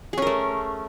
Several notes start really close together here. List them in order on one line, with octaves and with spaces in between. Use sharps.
G#4 C#4 A#4 A3